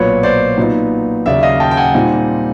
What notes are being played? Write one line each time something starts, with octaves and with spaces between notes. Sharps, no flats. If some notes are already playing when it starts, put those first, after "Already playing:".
Already playing: B1 A#2 F#3 B4 C#5
C5 D5
A#2 F#3 B3 D#4
D#2 C#3 F#3 D5 E5
D#5 F5
G5 A5
G5
F#5 G#5
A#2 G3 C4 D#4